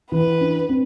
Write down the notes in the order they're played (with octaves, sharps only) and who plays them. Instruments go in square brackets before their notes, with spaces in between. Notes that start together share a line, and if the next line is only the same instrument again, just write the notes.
[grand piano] E3 [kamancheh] B4
[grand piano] D4
C4